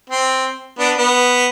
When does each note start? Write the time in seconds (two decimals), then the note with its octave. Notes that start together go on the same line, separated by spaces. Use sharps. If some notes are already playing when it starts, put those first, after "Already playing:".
0.09 C4
0.79 B3 D4
0.97 B3